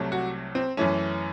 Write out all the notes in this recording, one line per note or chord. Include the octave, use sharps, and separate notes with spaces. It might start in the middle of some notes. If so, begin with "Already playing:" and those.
Already playing: C2 C3 F#3 A3
F#4
C4
F#2 E3 A3 C#4